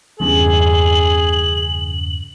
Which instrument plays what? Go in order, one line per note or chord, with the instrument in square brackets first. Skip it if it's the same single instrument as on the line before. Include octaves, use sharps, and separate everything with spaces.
[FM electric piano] E2 G2 C#3 [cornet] G#4 [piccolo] F#7